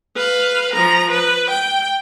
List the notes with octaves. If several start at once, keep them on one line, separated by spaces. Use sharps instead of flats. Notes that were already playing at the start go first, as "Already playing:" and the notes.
B4 F5
F3 A#5
B4
G5